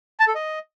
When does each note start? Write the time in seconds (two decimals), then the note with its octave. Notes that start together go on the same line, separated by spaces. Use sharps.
0.20 A5
0.27 A4
0.35 D#5